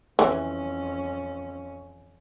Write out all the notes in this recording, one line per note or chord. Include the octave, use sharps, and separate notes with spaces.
F2 E3 C#4